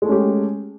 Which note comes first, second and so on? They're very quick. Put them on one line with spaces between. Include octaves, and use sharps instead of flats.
G#3 A3 C#4 G4